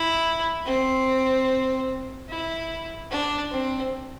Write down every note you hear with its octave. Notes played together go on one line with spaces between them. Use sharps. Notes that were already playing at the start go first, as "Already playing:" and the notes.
Already playing: E4
C4
E4
D4
C4